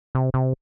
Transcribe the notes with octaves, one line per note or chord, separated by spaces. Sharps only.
C3
C3